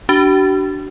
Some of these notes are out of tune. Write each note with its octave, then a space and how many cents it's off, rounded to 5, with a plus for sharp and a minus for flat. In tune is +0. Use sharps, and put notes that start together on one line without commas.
D4 +0 F#4 +45